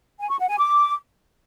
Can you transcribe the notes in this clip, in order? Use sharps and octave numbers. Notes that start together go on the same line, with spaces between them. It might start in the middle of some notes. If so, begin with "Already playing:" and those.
G#5
C#6
F#5
G#5
D6